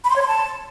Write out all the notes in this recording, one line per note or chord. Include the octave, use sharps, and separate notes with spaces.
B5
C6
C#5
C6
A5